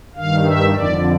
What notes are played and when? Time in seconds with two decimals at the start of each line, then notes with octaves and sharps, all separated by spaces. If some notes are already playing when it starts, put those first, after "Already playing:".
0.15 G2 D#3 F5
0.45 E5
0.74 F2 D3 D5